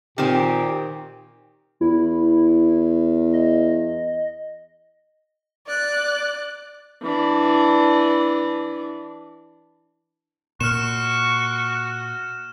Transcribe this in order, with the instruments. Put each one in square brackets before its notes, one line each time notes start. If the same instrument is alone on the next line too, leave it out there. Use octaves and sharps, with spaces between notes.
[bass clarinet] A#2 [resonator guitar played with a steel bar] D#3 C4 [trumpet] G4
[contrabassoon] E2 [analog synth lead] E4
[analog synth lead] D#5
[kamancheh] D5 F#6
[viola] E3 D4
[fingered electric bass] A#2 [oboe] F#4 [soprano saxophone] C#6 [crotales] F6 E7